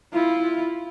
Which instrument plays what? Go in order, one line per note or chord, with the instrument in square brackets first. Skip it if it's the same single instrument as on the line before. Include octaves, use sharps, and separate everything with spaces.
[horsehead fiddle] E4 F4